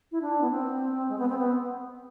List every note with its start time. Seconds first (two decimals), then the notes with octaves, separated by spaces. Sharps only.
0.11 E4
0.21 D4
0.41 B3
0.50 C4
1.09 G#3
1.18 B3
1.29 C4
1.38 B3